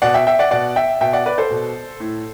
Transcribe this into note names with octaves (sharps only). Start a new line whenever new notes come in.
B2 D5 F#5
E5 G5
E5 G5
D5 F#5
B2 D5 F#5
E5 G5
B2 E5 G5
D5 F#5
B4 D5
A4 C5
B2
A2